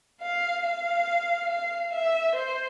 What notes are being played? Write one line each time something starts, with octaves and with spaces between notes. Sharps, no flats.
F5
F5
F5
E5
C5